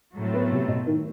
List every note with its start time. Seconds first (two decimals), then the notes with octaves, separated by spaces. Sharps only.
0.16 A2 F#3 A3 C4
0.34 B3
0.52 C3
0.68 B2
0.86 D#3